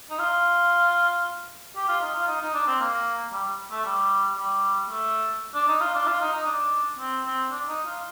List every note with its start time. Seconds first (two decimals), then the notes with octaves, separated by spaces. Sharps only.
0.10 D#4
0.19 F4
1.76 G4
1.88 F4
2.01 D#4
2.15 F4
2.28 D#4
2.41 D#4
2.54 D4
2.67 C4
2.80 A#3
3.33 G3
3.71 A3
3.85 G3
4.37 G3
4.90 A3
5.55 D4
5.68 D#4
5.81 F4
5.94 D4
6.07 F4
6.21 D#4
6.33 D#4
6.46 D4
6.99 C4
7.24 C4
7.51 D4
7.68 D#4
7.86 F4